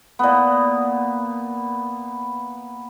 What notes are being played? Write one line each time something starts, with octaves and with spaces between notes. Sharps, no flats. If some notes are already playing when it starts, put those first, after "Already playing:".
A#2 B3